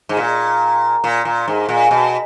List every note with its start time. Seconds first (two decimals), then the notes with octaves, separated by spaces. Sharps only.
0.09 G#2
0.17 A#2
1.04 A#2
1.25 A#2
1.48 G#2
1.69 A#2
1.91 B2